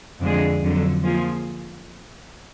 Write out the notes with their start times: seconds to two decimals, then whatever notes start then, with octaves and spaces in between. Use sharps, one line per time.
0.22 F2 D3 G#3 D4 G#4
0.63 F2 D3 F#3
1.03 F3 A#3 F4 G#4